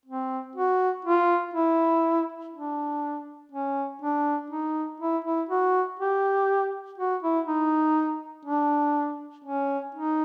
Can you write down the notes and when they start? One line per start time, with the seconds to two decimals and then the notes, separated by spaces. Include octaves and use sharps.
0.06 C4
0.55 F#4
1.05 F4
1.54 E4
2.54 D4
3.52 C#4
4.02 D4
4.50 D#4
5.00 E4
5.25 E4
5.49 F#4
5.99 G4
6.98 F#4
7.23 E4
7.47 D#4
8.45 D4
9.44 C#4
9.95 D#4